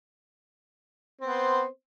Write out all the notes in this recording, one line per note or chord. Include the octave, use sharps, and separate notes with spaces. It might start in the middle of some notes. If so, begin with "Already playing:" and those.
B3 C4 C5